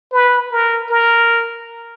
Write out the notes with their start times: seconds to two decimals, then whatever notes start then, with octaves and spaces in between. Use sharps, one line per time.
0.12 B4
0.52 A#4
0.89 A#4